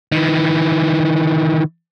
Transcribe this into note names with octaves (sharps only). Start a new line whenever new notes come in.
D#3 E3